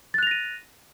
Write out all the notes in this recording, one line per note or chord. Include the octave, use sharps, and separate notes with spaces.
F#6 A6 A#6 D#7 F7